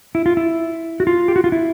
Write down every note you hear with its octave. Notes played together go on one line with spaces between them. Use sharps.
E4
F4
E4
F#4
F4
G4
F#4
F4
E4